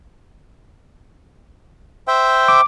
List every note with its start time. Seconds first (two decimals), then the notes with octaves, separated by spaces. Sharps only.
2.08 C5 E5 G5
2.48 D6